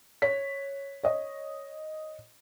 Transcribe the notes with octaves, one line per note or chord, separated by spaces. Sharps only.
C#5 B6
C#5 D#5